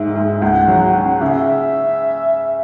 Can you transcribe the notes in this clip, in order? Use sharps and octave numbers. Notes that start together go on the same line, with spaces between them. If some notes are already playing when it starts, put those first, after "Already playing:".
Already playing: G#2 G#3 E5
G#2
C#2 F#5
F#3
C#4
C#3 E5